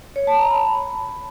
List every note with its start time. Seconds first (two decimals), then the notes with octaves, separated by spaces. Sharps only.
0.16 C#5
0.27 A5
0.39 A#5
0.51 B5